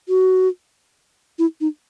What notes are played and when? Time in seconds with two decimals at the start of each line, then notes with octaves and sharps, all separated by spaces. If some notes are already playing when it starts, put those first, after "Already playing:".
0.09 F#4
1.39 E4
1.61 D#4